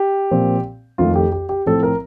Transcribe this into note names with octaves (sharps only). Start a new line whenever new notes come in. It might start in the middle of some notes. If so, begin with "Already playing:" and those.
Already playing: G4
A#2 F3 C4
F2 D#3 A3 F4
G4
G4
G4
A2 F3 C4 A4
A#4